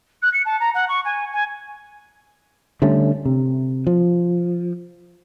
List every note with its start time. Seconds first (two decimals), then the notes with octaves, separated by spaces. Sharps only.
0.22 F#6
0.33 C#7
0.45 A5
0.59 A#5
0.74 F#5
0.88 C#6
1.04 G#5
1.32 G#5
2.82 D3 G3 A3 C#4
3.25 C3
3.87 F3